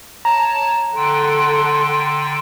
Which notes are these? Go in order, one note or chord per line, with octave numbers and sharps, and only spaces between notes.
C#5 A5 A#5
D3 A4 F#5 G5 C6